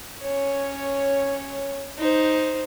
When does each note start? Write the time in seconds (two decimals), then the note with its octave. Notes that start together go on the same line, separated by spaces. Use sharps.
0.22 C#4 C#5
1.98 D#4 C5